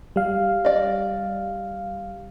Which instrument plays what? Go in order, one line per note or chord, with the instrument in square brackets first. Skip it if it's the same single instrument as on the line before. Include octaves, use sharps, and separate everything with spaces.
[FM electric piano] G3 F5
[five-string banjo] D5 D#5